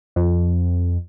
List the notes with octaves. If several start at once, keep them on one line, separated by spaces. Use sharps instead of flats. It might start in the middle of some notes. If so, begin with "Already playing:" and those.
F2